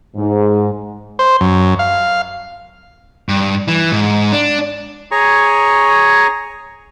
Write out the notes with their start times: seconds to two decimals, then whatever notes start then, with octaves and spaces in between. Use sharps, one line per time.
0.16 G#2
1.19 C5
1.41 F#2
1.79 F5
3.29 G2
3.68 E3
3.92 G#2
4.32 D4
5.11 G#4 C#5 G#5 A#5 C#6